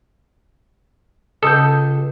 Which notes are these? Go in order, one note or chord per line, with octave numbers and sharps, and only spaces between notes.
C#2 A4 D#6 G6